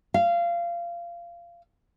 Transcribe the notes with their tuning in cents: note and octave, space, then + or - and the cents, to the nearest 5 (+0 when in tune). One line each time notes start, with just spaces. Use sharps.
F5 -20